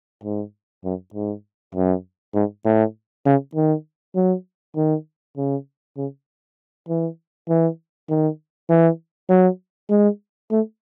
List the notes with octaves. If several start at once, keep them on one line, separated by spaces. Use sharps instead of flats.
G#2
F#2
G#2
F#2
G#2
A2
C#3
D#3
F#3
D#3
C#3
C#3
E3
E3
D#3
E3
F#3
G#3
A3